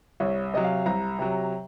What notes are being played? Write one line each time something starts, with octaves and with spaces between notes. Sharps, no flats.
C2 C#5
C3 F#3 D#5
F5
C2 A#5
C3 F#3